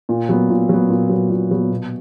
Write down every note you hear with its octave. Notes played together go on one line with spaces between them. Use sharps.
A#2
F#3 B3
A#2
F#3 B3
A#2
F#3 B3
A#2
F#3 B3
B2